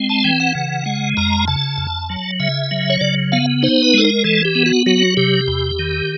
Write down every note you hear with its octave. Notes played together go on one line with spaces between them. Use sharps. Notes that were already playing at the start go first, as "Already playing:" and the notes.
Already playing: G#3 C4
A5
E3 G5
F#5
C#3
G#3
F2 A#5
C#3 A5
F2
F#3
C#3 E5
F#3
C#5
C#3 D5
B3 F5
D#4 C5
B4
G#3 A4
A#4
E3 A4
G4
B3
F#4
F#3 F#4
C3 G4
E2
D#3